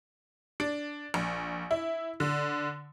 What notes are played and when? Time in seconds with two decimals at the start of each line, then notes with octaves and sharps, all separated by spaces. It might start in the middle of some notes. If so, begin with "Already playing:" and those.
0.60 D4
1.14 A#1
1.71 E4
2.20 D3